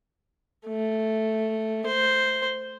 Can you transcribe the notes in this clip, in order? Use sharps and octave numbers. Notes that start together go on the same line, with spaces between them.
A3
C5